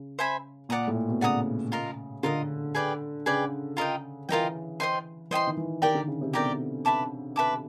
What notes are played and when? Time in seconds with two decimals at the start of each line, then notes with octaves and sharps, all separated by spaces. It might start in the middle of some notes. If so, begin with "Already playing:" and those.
Already playing: C#3
0.19 C5 E5 G#5 B5
0.69 A#2 D5 F#5 A#5 D#6
0.88 A2
0.95 A#2
1.09 B2
1.21 C#3 D5 F#5 A#5 D#6
1.72 F4 A#4 D#5
2.23 D3 F4 A#4 D#5
2.75 G#4 B4 D5 G5
3.26 C#3 G#4 B4 D5 G5
3.77 F4 A#4 D#5 G5
4.29 E3 F4 A#4 D#5 G5
4.80 C5 D#5 G5 C6
5.31 E3 C5 D#5 G5 C6
5.47 D#3
5.57 E3
5.82 D#3 G4 A#4 D5 G5
5.95 D3
6.08 C#3
6.21 C3
6.33 B2 G4 A#4 D5 G5
6.85 B4 E5 A5 D6
7.36 B4 E5 A5 D6